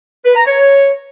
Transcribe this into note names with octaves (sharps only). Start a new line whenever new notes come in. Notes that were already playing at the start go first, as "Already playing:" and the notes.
B4
A#5
C#5